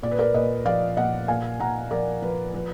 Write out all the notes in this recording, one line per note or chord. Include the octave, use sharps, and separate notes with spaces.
A#2 D5
B4
A#4 D5
A#2 B4 D#5
F3 D5 F5
A#2 D#5 F#5
A#2 F5 G#5
A#2 F#5 A#5
F3 A#4 D5
F3 B4
F3 B4